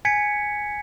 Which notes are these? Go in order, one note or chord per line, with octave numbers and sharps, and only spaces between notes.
G#5 G#6 B6 C#7